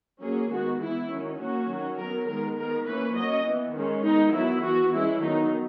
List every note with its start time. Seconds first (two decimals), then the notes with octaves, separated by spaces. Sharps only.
0.21 F#3 A#3 C#4 G#4
0.51 D#3 G#3 B3 F#4
0.80 E3 B3 E4
1.10 D#3 F#3 C#4
1.39 F#3 A#3 C#4 F#4
1.69 D#3 F#3 C#4
1.98 F#3 B3 A#4
2.27 D#3 G#3 B3 A#4
2.56 D#3 G#3 B3 A#4
2.85 E3 A#3 C#4 B4
3.15 F#3 C#4 D#5
3.45 E3 B3
3.74 D#3 G#3 C#4
4.03 D#3 G#3 B3 D#4
4.32 F#3 B3 E4
4.62 E3 B3 F#4
4.92 E3 G#3 C#4 E4
5.21 D#3 F#3 B3 D#4